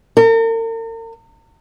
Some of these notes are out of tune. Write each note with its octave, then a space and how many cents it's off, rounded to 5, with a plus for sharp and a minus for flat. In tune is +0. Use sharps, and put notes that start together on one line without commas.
A#4 -45